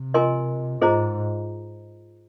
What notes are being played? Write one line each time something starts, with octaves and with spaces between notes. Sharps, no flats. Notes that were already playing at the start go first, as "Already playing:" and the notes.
Already playing: C3
F4 A#4 D#5 G#5 C6
G#2 F4 G#4 C5 D#5 A#5